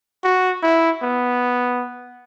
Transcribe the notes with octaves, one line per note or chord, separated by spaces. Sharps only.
F#4
E4
B3